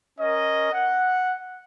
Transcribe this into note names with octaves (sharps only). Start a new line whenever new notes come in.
C#4 A#4 D#5
F#5